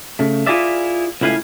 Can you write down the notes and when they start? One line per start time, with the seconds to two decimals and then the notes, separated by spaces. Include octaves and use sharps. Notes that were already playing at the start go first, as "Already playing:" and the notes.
0.19 C#3 A3
0.46 E4 F4 G#4 A#4 D5 E5
1.21 C#2 A2 E4 F5 G#5